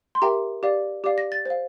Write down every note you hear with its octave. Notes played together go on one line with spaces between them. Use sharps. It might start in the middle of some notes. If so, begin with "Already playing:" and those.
C6
G4 A#4 E5 G5 A#5
G4 D5 F5
G4 D5 F5 D6
A#6
A6
C5 F5